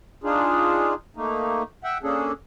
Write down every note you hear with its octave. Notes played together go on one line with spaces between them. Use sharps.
D4 D#4 F4 G#4
A3 A#3 D#4
E5 F#5 G5
A#3 C#4 D4 G#4 A4